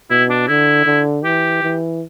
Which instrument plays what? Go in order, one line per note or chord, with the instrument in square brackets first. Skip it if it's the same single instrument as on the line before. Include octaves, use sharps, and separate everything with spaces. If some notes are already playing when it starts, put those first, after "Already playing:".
[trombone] B2 [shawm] E4
[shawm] D4
[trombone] D3 [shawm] E4
[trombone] D3
[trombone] E3 [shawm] G4
[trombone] E3